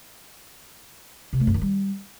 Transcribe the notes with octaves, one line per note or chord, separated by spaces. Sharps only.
C3
A3
F#2
D#3
G3